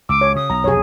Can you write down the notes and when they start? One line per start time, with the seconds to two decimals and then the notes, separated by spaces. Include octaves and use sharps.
0.09 C#2 D6 E6
0.21 C#5
0.36 C#3 D#6
0.50 B1 A#5
0.64 F1 B1 F2 G#4 C#5